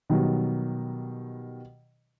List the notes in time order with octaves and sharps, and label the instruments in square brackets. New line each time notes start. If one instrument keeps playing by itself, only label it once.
[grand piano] B2 D#3 F#3 G3